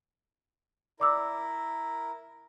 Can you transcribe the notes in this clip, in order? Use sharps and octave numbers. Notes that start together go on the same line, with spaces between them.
E4 A#4 D5 D6 E6